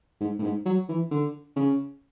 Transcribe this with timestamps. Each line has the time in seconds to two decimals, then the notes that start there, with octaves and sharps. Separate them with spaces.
0.20 G#2
0.38 A2
0.43 G#2
0.65 F#3
0.89 E3
1.11 D3
1.56 C#3